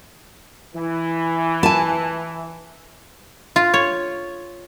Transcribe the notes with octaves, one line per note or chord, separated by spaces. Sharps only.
E3
G#5 A5
F4
C#5